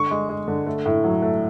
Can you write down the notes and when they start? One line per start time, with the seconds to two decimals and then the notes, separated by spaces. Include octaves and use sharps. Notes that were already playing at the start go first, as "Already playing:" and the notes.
Already playing: D3 C#6
0.11 G#3
0.29 G#3
0.48 D3
0.66 A3
0.86 A2
1.04 F#3
1.22 A3